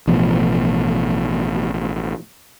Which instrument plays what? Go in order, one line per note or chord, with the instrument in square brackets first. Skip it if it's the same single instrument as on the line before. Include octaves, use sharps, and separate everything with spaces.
[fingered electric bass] A1 B2 F3